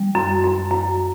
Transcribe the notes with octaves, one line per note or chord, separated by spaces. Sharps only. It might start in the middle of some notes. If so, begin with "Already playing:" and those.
Already playing: G3
F#2
F#2
F#2